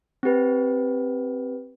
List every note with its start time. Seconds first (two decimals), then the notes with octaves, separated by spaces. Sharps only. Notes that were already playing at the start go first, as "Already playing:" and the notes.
0.23 C4 G4 B4